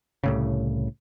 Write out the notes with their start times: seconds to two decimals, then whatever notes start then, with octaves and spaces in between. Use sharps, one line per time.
0.24 C2 A2 C#3